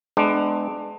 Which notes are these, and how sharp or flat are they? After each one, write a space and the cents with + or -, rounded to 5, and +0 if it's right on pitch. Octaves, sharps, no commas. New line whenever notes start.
G#3 +35 B3 +45 D4 +20